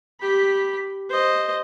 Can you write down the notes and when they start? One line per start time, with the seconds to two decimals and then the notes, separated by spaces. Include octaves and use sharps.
0.21 G4 B5
1.10 C5 D#5